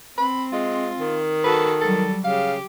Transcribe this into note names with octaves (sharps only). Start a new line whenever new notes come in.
C4 B5
G#3 F4
D#3
F#4 A4 B4
F#3 G3 A4
C#3 G4 F5